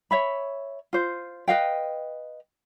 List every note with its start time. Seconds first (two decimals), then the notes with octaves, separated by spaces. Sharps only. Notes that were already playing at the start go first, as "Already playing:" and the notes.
0.11 C#5 E5 B5
0.93 F4 C5
1.48 B4 D#5 F5 G5